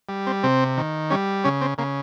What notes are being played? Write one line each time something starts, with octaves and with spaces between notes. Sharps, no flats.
G3
C4
C3 C4
D#3
G3 C#4
C#3 C#4
C4
C#3 A#3